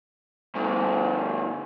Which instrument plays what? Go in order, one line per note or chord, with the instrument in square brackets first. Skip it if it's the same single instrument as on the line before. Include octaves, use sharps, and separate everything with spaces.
[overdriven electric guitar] D2 G2